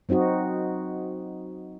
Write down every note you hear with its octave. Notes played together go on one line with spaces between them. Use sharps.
F#3 C4 D#4 F#4 D#5